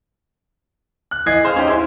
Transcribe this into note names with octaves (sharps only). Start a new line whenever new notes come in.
F#6
E3 D#5 G#6 C7
G#4 C5 F5 F6
C#4 D#4 G4
E4 C5